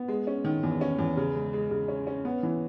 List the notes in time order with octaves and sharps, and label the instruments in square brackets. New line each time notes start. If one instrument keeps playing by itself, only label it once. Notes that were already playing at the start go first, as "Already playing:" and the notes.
Already playing: [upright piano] B3
G#3
C#4
D#3
E2
C#4
E2
C#3
G#3
G#3
C#3
C#4
C#4
B3
E3